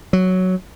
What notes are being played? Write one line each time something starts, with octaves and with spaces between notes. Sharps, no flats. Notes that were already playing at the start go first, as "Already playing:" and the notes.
F#3